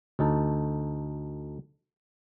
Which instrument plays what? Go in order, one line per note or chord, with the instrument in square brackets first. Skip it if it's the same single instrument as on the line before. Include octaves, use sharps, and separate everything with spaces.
[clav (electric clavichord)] D2 D#4 A4